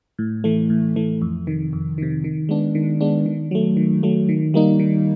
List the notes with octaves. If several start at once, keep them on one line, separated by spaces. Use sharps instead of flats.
A2
E3 A3
A2
E3 A3
F2
C3 D#3
F2
C3 D#3
D#3
G#3 B3 D4
D#3
G#3 B3 D4
D#3
F#3 A3
D#3
F#3 A3
D#3
G3 A#3 D#4
D#3